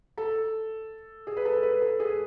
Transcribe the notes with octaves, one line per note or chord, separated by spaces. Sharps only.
A4
G#4
B4
A4
B4
A4
G#4